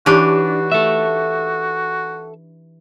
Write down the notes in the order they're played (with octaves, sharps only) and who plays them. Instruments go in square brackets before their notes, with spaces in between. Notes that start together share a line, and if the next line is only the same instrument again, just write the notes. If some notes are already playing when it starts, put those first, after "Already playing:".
[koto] E3 D4 [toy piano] D#4 G4 C#5 [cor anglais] F#4
[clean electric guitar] A4 E5